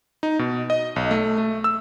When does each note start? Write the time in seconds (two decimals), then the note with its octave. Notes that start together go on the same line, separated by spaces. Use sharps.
0.23 D#4
0.39 B2
0.70 D#5
0.96 B1
1.11 A3
1.38 A3
1.64 E6